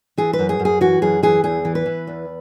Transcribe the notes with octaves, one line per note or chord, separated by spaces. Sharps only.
E3 G#4
B4
F#2
G#4
F#2
G#4
E3 F#4
F#2 G#4
E3 G#4
E2 G#4
E3
B4
E3
E2